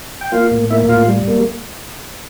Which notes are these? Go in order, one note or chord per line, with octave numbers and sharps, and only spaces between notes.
G5
A#3 F4 F5
A2
A#3 E4 E5
A2 F4 F5
G3
A#3